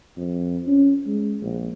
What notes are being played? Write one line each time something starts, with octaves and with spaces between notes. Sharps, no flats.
F2
C#4
G#3
A#1